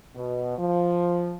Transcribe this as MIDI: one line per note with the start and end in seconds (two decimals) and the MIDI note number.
0.15 0.56 47
0.59 1.36 53